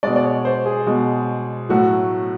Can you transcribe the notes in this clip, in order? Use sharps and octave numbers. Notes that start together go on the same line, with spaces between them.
B2 G#3 D5
D5
C#5
C5
G#4
B2 G#3
A2 F#3 A3 F#4